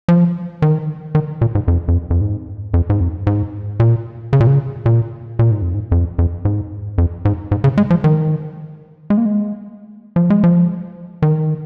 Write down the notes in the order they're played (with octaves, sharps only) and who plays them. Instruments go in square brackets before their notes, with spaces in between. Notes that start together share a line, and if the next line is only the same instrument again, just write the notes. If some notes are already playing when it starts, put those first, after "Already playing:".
[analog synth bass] F3
D#3
D#3
A#2
G#2
F2
F2
F2
G#2
F2
G#2
F2
G#2
A#2
C#3
A#2
C#3
A#2
A#2
G#2
F2
G#2
F2
F2
G#2
F2
G#2
G#2
C#3
G#3
F3
D#3
G#3
A#3
G#3
F3
G#3
F3
D#3